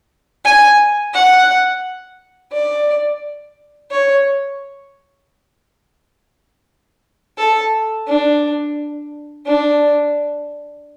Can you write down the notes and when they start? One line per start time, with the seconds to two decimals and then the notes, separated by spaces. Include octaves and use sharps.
0.45 G#5
1.13 F#5
2.53 D5
3.91 C#5
7.38 A4
8.08 D4
9.47 D4